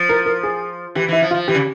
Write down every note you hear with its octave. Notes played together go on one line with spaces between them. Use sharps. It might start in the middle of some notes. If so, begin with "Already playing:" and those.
Already playing: F3
A#4
A#4
G#4
E3 G4
E3 E4
F3
F4
F3
E3 G4
C#3